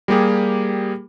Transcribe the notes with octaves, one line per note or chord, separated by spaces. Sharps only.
G3 A#3 G4 G#4